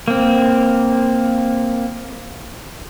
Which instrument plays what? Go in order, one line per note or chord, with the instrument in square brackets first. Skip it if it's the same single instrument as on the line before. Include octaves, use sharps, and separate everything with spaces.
[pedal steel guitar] A#3 C4